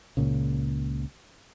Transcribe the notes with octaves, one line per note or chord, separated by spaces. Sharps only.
C#2 A#2 C#3